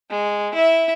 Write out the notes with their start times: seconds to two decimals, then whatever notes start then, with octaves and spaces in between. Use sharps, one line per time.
0.10 G#3
0.54 E4 E5